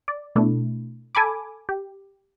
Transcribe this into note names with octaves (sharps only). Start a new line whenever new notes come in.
D5
B2 A3 D4 E4
A4 G#5 B5 D6
G4